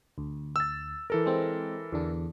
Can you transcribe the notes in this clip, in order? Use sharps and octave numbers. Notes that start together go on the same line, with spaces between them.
D2
E6 A6
E3 A4 A#4
G#3 C4
E2 D3 D4